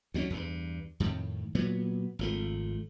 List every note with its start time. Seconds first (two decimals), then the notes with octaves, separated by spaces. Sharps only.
0.14 D2 F#3 G3 C#4
0.30 E2 G2
1.00 F2 A2 D#3
1.55 A#2 F#3 B3
2.19 G#1 F3 A3